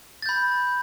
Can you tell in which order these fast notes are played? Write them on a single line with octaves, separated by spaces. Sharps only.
A6 G6 B5